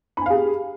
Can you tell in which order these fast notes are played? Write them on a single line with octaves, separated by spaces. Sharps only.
B5 G#5 F5 G#4 G4